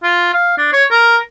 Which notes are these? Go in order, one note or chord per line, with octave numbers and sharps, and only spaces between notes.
F4
F5
D4
C#5
A#4